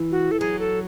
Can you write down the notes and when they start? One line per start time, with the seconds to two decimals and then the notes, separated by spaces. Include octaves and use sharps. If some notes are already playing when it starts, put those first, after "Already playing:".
Already playing: E3
0.12 F#4
0.31 A4
0.40 F#3 G#4
0.59 A4